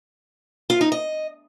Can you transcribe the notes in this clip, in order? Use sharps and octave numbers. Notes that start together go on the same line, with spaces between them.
F4
D#4
D#5